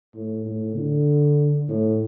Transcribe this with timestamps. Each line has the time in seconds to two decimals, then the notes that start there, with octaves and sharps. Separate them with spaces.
0.14 A2
0.45 A2
0.75 D3
1.69 A2